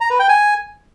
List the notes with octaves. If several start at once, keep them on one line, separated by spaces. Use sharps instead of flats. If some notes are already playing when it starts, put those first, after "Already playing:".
A#5
B4
G5
G#5